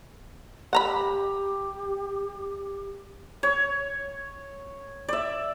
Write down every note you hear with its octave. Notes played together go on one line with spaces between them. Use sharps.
G4 F#5 A#5 B5
C#5
D5 E5